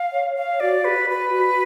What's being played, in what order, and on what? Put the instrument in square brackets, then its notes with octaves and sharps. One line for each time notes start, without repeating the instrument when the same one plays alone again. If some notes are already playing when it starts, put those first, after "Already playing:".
Already playing: [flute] F5
[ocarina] C#5
[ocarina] C#5 [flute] F5
[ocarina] F#4 [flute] D5
[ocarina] F#4 G#4 [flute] B4
[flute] B4
[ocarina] F#4